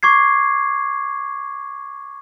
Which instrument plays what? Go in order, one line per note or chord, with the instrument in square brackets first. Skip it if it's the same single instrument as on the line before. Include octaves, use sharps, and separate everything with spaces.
[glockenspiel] C#6 D6 G#6 C7